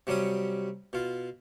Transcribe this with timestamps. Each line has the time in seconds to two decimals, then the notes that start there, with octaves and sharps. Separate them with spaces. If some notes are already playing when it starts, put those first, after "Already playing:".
0.07 C3 F#3 G3 C#4 D#6
0.93 B2 F4